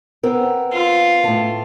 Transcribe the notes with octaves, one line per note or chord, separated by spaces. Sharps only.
B3 C4 A#4
F4
A2 A5